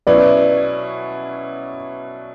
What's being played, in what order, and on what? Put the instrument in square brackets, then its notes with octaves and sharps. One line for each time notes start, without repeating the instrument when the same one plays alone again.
[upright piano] B2 F#3 C#4 E4 [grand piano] B4 D5